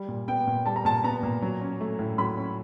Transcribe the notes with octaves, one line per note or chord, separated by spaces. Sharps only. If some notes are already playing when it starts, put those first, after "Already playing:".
Already playing: G3
A#2
B3 G5
A#2
G3 A5
A#5
A#2 A5
B3 A#5
A#2
F#3
C#4
A3
A2
F#3 B5
C#4